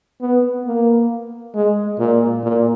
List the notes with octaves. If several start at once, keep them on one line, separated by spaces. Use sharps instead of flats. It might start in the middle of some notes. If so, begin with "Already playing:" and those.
B3
A#3
G#3
A#2
A#2